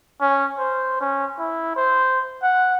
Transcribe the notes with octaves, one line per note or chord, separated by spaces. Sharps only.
C#4
C5
C#4
E4
C5
F#5